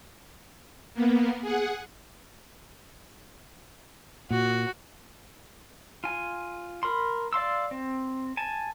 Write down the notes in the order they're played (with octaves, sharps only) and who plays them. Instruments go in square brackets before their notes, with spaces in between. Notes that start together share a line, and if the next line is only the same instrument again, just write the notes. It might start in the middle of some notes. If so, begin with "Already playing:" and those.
[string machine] A#3 B3
G#4 F#5
[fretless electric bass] A#2 [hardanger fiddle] F#4
[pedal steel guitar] F4 G#5
A#4 B5 C6
D5 F5 C6 E6
C4
G#5 A5